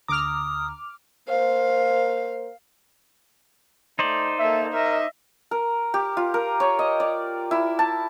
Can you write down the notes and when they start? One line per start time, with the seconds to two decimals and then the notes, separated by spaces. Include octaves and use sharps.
0.08 D2 D3 A#5 D6 D#6 F6
1.28 A#3 A#4 C5 F5
3.99 A3 D#4 C5 D5
4.39 A#3 A4 E5
4.73 A#4 D#5 E5
5.51 A#4
5.94 G4
6.17 F4
6.34 A#4
6.60 C#5
6.79 D#5
7.00 D5
7.51 E4
7.79 A5